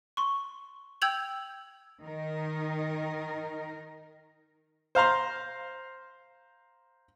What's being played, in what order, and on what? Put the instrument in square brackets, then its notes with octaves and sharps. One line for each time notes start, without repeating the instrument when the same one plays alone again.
[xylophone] C6 C#6
G5 E6 G6 G#6 F7 F#7
[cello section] D#3 D#4 A#4
[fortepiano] C5 F5 A#5 C6